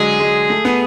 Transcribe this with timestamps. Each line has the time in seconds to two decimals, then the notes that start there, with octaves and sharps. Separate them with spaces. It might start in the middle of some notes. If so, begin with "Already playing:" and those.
Already playing: D3 F#3 G#3 G#4
0.20 G#3
0.50 A3
0.65 B3